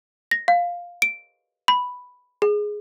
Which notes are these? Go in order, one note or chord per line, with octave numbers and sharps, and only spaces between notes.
A#6
F5
D7
B5
G#4